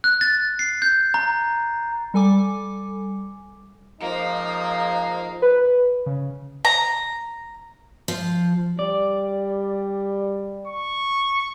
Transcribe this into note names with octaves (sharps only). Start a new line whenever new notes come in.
F#6
A6
C7
G6
A#5
G3 A4 G#5 D6
F3 G#3 A#3 D#4 F5
B4
C#3
A#5
F3
G3 D5
C#6